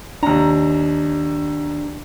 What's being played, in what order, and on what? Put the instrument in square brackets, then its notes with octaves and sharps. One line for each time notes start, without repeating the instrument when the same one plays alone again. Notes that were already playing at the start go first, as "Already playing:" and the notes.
[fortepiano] D#2 A#5 [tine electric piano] D4